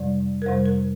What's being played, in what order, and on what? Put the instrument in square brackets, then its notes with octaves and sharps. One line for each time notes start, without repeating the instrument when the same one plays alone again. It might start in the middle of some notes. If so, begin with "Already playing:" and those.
Already playing: [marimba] F2 C3 G3 D5
A#4
F2 C3 G3 C5
A#4